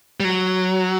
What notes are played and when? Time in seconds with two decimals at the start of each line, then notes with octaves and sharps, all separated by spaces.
0.20 G3
0.24 F#3